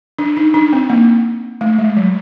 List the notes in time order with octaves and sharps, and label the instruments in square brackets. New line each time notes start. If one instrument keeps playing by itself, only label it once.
[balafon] D4
D#4
D4
C4
A#3
A3
G#3
F#3